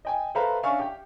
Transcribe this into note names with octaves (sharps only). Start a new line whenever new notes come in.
D#5 G5 G#5
A4 B4 C5 E5 F5 A#5
C#4 D4 E5 F5 G#5 C#6
G4 G5